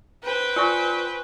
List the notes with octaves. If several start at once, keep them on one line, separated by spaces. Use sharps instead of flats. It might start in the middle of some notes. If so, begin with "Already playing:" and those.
B4 C5 G5
F4 G#5 C#6